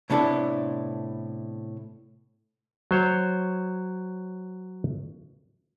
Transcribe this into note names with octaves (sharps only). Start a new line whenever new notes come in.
A2 C3 B3 D4 E4 A4
F#3 C5 C#5